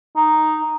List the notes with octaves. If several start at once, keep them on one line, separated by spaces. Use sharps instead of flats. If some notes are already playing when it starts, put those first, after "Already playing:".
D#4